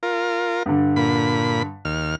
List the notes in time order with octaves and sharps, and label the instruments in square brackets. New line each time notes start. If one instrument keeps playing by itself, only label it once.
[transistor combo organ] F4 A#4
[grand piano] G2 D3
[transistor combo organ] A#2 B5
D#2 F6